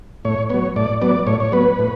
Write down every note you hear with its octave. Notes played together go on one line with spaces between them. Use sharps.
A2 C#5
F#3 B3 C#5
A2 D5
F#3 B3 D5
A2 C#5
C#5
F#3 B3 B4
A2